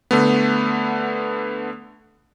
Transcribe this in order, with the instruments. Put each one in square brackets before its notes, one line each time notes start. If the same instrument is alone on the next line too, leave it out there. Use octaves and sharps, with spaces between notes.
[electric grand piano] D3 A3 B3